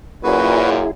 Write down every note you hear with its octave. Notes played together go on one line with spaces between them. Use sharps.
F#2 A#2 E4 F#4 G#4 B4